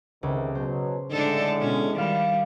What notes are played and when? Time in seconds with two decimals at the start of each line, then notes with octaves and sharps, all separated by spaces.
0.23 C#2 C3 D#3
0.55 B2 F#3 C5
1.11 A2 D3 G#3 D4 D#4 A4
1.59 B2 C#4
1.96 D#3 G3 D5 F5 B5